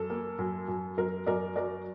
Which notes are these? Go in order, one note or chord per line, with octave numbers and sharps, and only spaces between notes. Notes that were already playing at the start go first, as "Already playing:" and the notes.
Already playing: F#2 A4
A#3
F#2
F#2
F#2 A#4
F#2 A#4 D5
F#3 A#4 D5